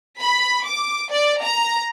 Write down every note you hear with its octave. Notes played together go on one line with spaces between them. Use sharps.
B5
D6
D5
A#5